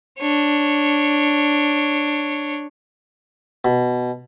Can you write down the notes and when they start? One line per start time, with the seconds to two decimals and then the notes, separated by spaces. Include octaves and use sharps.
0.20 D4 C#5
3.65 B2